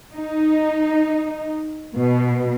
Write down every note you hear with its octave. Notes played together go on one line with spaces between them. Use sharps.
D#4
B2